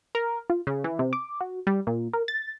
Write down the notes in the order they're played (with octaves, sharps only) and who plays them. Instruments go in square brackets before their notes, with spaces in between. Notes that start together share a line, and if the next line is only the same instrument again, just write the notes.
[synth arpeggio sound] A#4
F4
C#3
E3
C3
D6
F#4
G3
A#2
A#4
A6